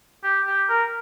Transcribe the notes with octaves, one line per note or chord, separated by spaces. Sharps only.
G4
G4
A#4